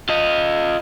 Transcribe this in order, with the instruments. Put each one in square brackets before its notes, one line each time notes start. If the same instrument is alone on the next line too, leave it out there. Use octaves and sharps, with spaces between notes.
[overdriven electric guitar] F4 D#5